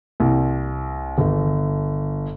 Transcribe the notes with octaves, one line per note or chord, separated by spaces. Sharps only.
C2
G1